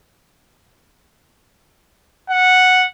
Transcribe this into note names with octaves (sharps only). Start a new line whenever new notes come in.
F#5